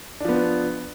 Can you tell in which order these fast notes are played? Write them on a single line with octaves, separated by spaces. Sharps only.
D4 F3 B3